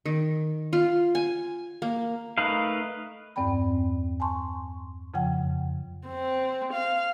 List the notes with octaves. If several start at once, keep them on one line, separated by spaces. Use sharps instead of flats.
D#3
F4
G#5
A#3
A3 D#4 A#4 B4 F5
E2 G2 C4 D5 G5 B5
G#5 A5 C6 C#6
F2 C#3 F3 F#5 G5
C4
F5